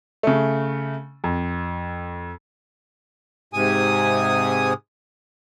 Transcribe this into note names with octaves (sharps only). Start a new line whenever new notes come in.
C#3 A3
F2
G#2 C3 G#5 D#6